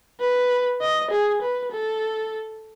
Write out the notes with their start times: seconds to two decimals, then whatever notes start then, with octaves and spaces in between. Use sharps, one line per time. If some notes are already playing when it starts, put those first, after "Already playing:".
0.20 B4
0.81 D#5
1.11 G#4
1.42 B4
1.71 A4